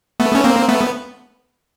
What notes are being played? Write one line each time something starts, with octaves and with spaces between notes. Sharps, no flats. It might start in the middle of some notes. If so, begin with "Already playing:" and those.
A3 B3
C#4
A#3 C4
A3 B3